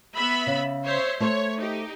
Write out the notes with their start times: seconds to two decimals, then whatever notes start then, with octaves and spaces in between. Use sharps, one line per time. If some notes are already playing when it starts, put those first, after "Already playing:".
0.15 B3 E5 B5
0.47 C#3
0.84 C5 C#5 E5
1.20 A3 C5 C#5
1.58 D#4 G4